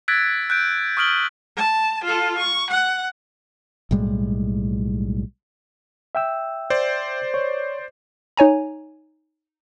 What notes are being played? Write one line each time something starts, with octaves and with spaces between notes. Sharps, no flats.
E6 F#6 G#6 A6 B6 D7
F#6 G6 D7
C#6 D#6 F6 D7 F#7 G7
A5
F4 A4
C#6
F#5
B1 A2 G3 G#3
E5 G5 E6
C5 D5
C#5
D#4 C#5 G#5 A#5